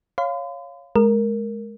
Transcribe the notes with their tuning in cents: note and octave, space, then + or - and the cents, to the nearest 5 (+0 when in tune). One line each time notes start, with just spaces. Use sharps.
C#5 +0 F5 +0 C6 -45
G#3 +20 A#4 +0